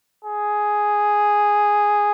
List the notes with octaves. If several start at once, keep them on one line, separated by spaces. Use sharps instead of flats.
G#4